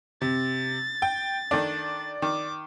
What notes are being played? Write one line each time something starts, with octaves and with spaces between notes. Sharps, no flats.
C3 A6
G5
D#3 A3 D4 D5
D#3 D6